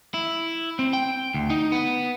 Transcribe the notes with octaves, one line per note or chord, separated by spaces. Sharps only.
E4
C4
G5
D2
D#4
B3